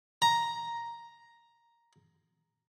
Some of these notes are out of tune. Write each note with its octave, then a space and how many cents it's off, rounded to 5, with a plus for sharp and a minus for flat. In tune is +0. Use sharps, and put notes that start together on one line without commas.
A#5 +5